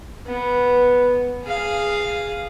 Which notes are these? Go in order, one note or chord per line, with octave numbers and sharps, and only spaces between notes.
B3
G#4 F5